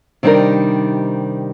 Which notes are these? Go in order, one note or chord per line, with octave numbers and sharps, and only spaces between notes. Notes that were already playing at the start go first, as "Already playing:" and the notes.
C3 D#3 G3 D4 D#4 A#4